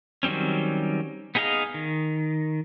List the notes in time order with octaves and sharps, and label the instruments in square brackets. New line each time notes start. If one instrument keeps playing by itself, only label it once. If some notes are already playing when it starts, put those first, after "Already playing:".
[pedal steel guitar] D#3 F#3 G3 C4 C#4
B3 D#4 G#4 D#5 F5
D#3